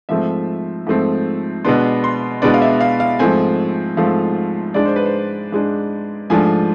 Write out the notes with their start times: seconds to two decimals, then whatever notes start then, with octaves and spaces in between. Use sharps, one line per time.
0.09 G#2 F3 A3 C4 E5
0.87 G#2 F3 A3 C4
1.64 B2 G#3 B3 D4 C6
2.04 C6
2.42 B2 G#3 B3 D4 D5
2.54 F5
2.62 E5
2.81 F5
3.00 F5
3.19 G#2 F3 A3 C4 G#5
3.97 G#2 F3 A3 C4 F5
4.74 G#2 G#3 D4 D5
4.85 C5
4.96 B4
5.06 C5
5.52 G#2 G#3 D4
6.30 G#2 F3 A3 D4 G#5